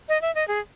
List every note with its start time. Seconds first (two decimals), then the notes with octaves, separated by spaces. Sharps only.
0.09 D#5
0.22 E5
0.35 D#5
0.48 G#4